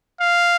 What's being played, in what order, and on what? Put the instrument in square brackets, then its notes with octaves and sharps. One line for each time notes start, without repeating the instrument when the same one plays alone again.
[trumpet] F5